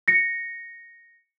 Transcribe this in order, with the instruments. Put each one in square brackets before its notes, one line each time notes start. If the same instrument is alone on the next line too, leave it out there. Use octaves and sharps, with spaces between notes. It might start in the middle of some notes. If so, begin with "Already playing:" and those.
[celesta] A#6 C#7